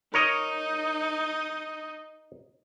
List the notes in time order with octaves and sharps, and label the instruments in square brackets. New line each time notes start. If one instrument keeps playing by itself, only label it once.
[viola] D#4 [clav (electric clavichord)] A#4 C#5 D#5